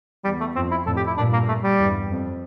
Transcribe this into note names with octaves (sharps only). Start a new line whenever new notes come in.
E2 G3
A3
F2 C4
E4
F2 A2 A4
G4
E4
G2 A#2 D4
A#3
A3
G3
E2 G2
F2